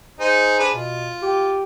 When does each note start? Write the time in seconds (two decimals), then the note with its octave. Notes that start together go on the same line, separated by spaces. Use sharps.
0.20 D#4 G#4 C5
0.59 D4 G#4 B4
0.73 B2 F4
1.23 G4